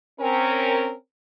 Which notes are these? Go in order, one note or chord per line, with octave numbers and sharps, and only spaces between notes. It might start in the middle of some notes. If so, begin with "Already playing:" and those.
C4 C#4 A#4